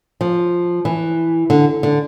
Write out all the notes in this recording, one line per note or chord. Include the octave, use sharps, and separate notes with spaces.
F3
E3
D3
D3